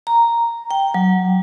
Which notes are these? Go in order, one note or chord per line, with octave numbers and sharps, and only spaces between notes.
A#5
G5
F#3